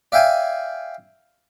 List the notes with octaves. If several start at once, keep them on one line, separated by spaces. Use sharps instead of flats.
D5 E5 F5 G5 G#5